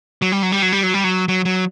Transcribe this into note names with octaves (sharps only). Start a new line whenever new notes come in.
F#3
G3
F#3
G3
F#3
G3
F#3
G3
F#3
F#3
F#3